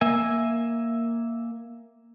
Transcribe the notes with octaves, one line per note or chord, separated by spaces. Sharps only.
A#3 E5 G#5